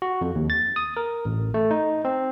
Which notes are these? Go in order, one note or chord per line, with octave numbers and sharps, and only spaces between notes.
F#4
F2
D#2
A6
D#6
A#4
A1
A3
D#4
C4